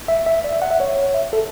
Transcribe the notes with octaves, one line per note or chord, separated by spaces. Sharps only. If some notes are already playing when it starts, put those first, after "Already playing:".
E5
E5
D5
E5
F#5
E5
C#5
E5
A4